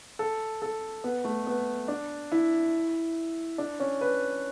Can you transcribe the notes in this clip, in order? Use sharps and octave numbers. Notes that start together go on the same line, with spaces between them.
A4
A4
B3
A3
B3
D4
E4
D4
C#4
B4